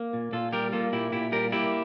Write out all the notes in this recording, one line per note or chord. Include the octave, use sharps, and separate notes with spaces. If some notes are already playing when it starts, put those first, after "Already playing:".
Already playing: A#3
A#2
A#2 F4 A4
G3 G4 A#4
A#3 F4 A4
A#2 E4 G4
A#2 E4 G4
G3 G4 A#4
A#3 E4 G4